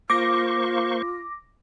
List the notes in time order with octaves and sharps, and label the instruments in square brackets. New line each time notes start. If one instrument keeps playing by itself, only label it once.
[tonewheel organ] A#3 C5 C#6 [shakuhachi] F4 [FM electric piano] D6 A#6